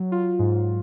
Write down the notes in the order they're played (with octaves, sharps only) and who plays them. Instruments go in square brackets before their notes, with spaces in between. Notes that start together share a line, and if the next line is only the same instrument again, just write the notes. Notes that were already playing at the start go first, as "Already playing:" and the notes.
Already playing: [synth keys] F#3
F4
G#2